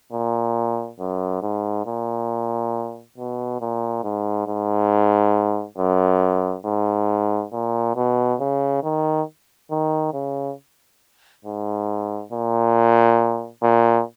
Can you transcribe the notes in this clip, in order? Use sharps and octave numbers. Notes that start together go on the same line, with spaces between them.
A#2
F#2
G#2
A#2
B2
A#2
G#2
G#2
F#2
G#2
A#2
B2
C#3
D#3
D#3
C#3
G#2
A#2
A#2